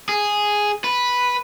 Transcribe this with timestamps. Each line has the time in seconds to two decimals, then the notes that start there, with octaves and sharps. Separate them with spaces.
0.09 G#4
0.84 B4